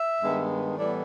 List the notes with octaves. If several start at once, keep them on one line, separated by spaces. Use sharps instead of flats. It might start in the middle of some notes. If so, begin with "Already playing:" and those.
Already playing: E5
G2 D#3 G#3 B3
A2 E3 G3 B3 D5